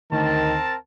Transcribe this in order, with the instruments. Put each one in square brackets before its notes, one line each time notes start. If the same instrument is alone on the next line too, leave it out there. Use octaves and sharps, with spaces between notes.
[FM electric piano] D2 [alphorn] D#3 [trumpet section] C4 A#4 A5